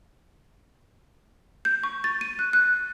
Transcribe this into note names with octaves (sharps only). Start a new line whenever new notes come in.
G6
C#6
A6
D#7
F#6
F#6